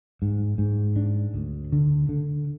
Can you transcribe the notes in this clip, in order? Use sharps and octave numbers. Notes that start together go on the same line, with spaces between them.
G#2
G#2
D4
D2
D3
D3